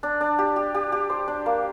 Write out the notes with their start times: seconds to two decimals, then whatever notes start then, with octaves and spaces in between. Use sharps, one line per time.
0.03 D4
0.21 D4
0.39 G4
0.56 G4
0.74 G4
0.92 G4
1.10 C5
1.28 D4
1.46 A#3